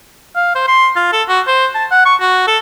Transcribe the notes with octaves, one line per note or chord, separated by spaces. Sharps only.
F5
C5
C6
F4
A4
F#4
C5
A5
F#5
C#6
F#4
A4